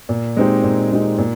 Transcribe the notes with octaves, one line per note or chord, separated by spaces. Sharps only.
A#2
G#3 C4 D#4 G4
A#2
G#3 C4 D#4 G4
A#2